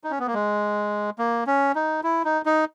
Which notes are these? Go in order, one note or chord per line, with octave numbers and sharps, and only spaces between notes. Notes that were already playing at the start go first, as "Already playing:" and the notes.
D#4
C#4
B3
A#3
G#3
A#3
C#4
D#4
E4
D#4
D#4